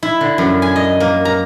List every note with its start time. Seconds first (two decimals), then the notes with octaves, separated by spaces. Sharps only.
0.03 E4
0.21 D3
0.38 F#2
0.62 G#5
0.76 D#5
1.00 A#3
1.25 A#5